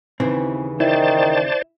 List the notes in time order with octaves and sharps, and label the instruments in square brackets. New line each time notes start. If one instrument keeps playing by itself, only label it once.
[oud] D#2 C#3 E3 [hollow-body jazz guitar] C4
[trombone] D#3 [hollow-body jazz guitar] E4 [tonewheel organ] C5 D5 A5